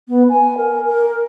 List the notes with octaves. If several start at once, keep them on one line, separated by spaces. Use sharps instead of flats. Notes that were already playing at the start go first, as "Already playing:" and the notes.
B3
G#5
A#4
A#4